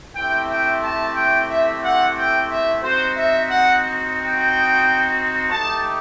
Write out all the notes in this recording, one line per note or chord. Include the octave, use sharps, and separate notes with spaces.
A3 C4 E4 G4 G5
G5
A5
G5
E5
F#5
G5
E5
C4 D#4 F#4 C5
E5
F#5
G5
A3 D#4 G4 A5